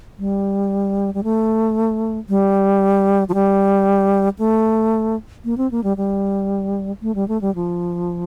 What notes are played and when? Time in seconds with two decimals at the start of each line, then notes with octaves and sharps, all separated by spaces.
0.19 G3
1.14 G3
1.24 A3
2.29 G3
3.29 F3
3.34 G3
4.39 A3
5.45 A#3
5.58 C4
5.71 A#3
5.84 G3
5.97 G3
7.02 A3
7.15 G3
7.28 A3
7.41 G3
7.55 F3